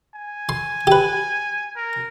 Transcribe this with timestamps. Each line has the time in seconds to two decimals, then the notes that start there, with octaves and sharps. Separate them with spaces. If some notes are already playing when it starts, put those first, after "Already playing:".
0.14 G#5
0.49 C6
0.87 G4 B4
1.76 A#4